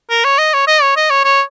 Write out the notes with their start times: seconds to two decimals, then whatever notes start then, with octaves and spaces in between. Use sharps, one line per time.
0.10 A#4
0.24 C#5
0.38 D#5
0.53 C#5
0.67 D#5
0.82 C#5
0.96 D#5
1.10 C#5
1.24 C#5